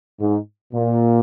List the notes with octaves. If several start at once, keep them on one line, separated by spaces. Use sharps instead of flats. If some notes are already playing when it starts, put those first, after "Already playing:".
G#2
A#2